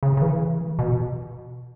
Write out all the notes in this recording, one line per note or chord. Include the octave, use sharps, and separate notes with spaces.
C#3
C#3
E3
B2